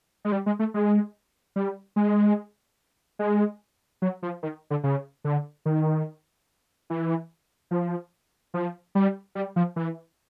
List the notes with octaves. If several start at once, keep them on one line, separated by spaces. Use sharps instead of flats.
G#3
G3
G#3
A3
G#3
G3
G#3
G#3
F#3
F3
D#3
D3
C#3
D3
D#3
E3
F3
F3
G3
G3
F3
E3